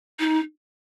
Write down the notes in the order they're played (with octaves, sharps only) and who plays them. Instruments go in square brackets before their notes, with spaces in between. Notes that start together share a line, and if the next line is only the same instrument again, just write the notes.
[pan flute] D#4